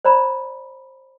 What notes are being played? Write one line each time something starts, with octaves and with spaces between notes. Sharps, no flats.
C5 D5 A#5 B5